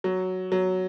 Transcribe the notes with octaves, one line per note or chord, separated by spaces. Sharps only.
F#3
F#3